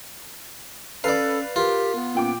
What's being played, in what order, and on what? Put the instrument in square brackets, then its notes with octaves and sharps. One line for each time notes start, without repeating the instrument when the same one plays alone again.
[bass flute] C#4 [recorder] A4 [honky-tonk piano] B4 [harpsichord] D5 F5
[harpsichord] F4 [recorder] G4 [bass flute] A#4
[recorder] B3
[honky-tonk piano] A#2 G5 D6 [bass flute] C#4